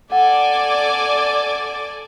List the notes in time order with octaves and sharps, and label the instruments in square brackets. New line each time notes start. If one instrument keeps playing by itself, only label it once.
[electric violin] A4 G#5 [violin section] D5 D6 [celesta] F#5